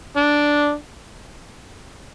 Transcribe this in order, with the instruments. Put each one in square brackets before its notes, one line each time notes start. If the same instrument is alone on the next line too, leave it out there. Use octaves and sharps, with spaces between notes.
[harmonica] D4